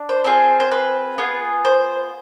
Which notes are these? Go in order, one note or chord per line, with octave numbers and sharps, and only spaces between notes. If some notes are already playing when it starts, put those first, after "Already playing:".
Already playing: D4
C5
C4 F4 G#4 C5
C5
B4
B3 F4 G#4
C5